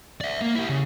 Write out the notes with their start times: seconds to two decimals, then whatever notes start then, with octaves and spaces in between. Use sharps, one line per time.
0.21 D5 E5
0.42 A#3
0.55 E4 G4
0.69 C#3